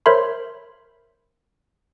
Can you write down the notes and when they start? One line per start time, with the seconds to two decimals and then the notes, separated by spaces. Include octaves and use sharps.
0.06 A#4 C5 C#5 E5 B5 C6